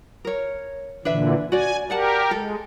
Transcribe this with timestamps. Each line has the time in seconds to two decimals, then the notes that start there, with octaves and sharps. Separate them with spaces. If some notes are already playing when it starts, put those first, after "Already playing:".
0.25 A#4 C#5
1.05 A#2 D3 E3 D4 B4 E5
1.52 F#4 D5 G#5
1.90 G4 A#4 D5 F#5 A5
2.31 G#3 A4